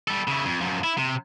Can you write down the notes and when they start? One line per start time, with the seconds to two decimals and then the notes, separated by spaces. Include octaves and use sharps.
0.08 G3 A4
0.28 C#3 E4
0.45 F2
0.60 F#2 F3
0.84 E4
0.98 C3